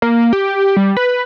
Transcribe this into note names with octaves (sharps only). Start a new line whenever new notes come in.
A#3
G4
G3
B4